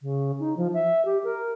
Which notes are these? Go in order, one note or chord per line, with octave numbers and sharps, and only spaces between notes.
C#3
D#4
F3
E5
G4
A#4